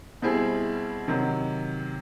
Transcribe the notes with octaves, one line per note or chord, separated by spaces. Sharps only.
B2 G3 C4 E4 G#4
C3 D#3 F#3